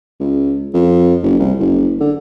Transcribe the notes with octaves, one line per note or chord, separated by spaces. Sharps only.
C#2
F2
F#1
C2
F#1
D3